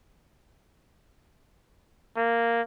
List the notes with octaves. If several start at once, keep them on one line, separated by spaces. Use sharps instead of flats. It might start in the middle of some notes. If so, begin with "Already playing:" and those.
A#3